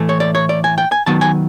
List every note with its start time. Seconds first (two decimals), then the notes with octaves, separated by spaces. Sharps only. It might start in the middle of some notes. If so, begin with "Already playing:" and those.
Already playing: A2 E3 A3
0.09 C#5
0.20 D5
0.35 C#5
0.49 D5
0.64 G#5
0.78 G5
0.92 G#5
1.06 D#3 F#3 B3 A5
1.21 G#5